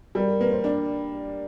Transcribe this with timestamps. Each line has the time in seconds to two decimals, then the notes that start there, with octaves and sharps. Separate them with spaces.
0.15 G3 A#4
0.28 A#4
0.40 A#3 B4
0.52 C5
0.64 D4 D5